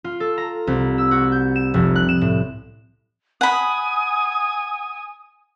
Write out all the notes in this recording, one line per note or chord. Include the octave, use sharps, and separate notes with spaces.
F4
A4
A#5
C2
E6
F#4
G6
E7
F1
F#6
E7
A2
F#5 G#5 B5 D#6